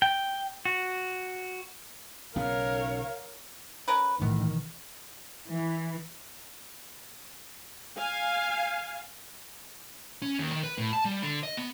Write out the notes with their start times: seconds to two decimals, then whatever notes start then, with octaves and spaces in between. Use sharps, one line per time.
0.02 G5
0.65 F#4
2.36 B1 C#3 B3 A#4 C#5 F5
3.88 C#4 A#4 B4
4.22 B1 A2 D#3 E3 B3
5.49 E3
7.97 F5 G#5
10.22 C#4
10.39 D#2
10.52 D#3
10.63 B4
10.78 A2
10.93 A5
11.05 G3
11.23 D3
11.43 D#5
11.57 B3